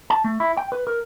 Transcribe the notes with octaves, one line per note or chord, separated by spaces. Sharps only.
A5
A3
E4
G5
B4
A#4